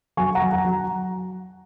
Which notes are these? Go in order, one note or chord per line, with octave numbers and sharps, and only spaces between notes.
F#3 G#5 C#6
F#5 A#5
F#3
F#5 A#5
F#3